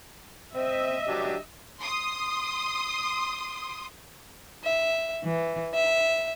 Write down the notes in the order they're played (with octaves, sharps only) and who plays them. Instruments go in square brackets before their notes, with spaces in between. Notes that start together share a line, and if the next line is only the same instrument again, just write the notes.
[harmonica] C4 [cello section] D#5 E5
[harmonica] F#3 D4 G4
[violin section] C6 D#6
[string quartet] E5
E3
E5